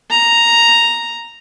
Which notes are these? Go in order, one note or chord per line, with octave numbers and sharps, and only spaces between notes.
A#5